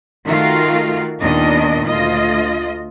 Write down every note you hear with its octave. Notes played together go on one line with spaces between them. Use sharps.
D#3 A3 F4 F#4 A#4 F5
D#2 A#2 D#3 B3 D4 D#5
D2 F4 D#5